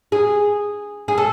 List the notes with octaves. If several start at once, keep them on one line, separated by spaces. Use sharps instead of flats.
G#4
G#4
A4